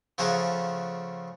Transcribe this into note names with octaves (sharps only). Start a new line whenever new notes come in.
C#3 F3 A3 G#4 F#5 A#5